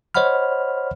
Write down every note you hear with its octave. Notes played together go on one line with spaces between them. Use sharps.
C5 C#5 D#5 F#5 B5 F6